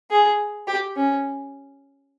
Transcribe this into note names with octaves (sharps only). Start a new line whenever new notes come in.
G#4
G4
C#4